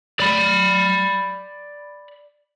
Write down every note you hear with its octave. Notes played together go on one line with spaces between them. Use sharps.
D5 B5